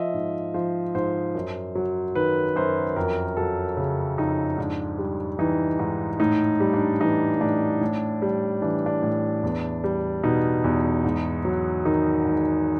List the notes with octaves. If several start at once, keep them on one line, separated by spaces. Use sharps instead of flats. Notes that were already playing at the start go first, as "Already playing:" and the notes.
Already playing: F3 D#5 E5
G#2
F3 C5
G#2 C5
F#2
F#3
D#3 B4
F#2 C5
F2 A#4
F#3 A4
C#3
F2 D#4
G#2 D4
G3
E3 D#4
G#2 D#4
A2 D#4
G3
D4
E3 D#4
A2 D4
A2
G3
E3 D4
D4
A2
E2
G3
B2 D#4
E2
G#2
F#3
D#3 D#4
G#2